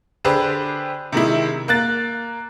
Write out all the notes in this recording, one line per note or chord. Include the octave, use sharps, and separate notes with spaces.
D3 D4 G4 G#4 B4 C5
C3 D#3 G#3 E4
A#3 F#6 A6